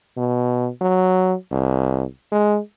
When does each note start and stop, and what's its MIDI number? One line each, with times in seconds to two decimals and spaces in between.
0.17 0.69 47
0.81 1.34 54
1.52 2.04 36
2.32 2.59 56